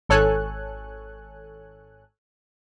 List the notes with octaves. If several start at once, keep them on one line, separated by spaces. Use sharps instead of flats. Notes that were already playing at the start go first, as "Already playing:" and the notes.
G#1 A4 C#5 G#5 F#6